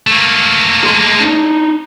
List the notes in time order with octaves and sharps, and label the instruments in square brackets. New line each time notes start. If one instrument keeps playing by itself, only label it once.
[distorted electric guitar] A3 A#3
[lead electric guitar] G#4 C6
D4 D#4